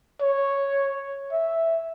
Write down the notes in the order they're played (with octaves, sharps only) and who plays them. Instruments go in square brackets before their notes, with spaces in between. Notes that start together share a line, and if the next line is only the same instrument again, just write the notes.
[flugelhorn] C#5
E5